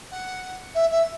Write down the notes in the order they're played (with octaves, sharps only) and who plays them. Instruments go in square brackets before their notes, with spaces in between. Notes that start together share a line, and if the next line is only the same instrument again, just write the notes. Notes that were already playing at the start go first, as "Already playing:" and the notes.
[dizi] F#5
E5
E5